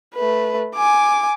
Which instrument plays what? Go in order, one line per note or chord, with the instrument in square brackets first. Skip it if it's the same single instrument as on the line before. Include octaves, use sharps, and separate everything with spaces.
[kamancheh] A3 B4
G#5 D6